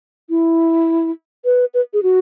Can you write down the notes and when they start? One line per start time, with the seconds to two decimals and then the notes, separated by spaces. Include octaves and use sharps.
0.30 E4
1.45 B4
1.74 B4
1.93 G#4
2.03 F#4